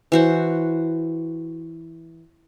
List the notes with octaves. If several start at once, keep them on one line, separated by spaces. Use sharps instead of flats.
E3 F#4 C5